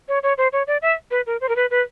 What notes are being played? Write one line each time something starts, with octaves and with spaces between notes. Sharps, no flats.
C#5
C#5
C5
C#5
D5
E5
B4
A#4
C5
A#4
B4
B4